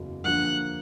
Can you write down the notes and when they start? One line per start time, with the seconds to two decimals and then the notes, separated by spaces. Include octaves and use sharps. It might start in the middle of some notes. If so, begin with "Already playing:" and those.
Already playing: F#1 E2 C#3 F#3
0.24 G2 D3 F3 A#3 F#5